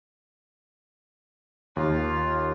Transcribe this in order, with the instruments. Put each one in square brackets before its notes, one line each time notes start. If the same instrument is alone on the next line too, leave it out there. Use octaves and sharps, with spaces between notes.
[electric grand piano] D#2 [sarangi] F4